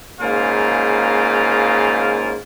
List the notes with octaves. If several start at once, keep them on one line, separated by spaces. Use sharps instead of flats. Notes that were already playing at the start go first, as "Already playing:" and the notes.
G#2 C#3 A#3 F4